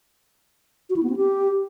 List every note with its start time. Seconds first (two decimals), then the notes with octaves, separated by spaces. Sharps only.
0.90 F#4
0.96 E4
1.03 B3
1.10 C4
1.16 G4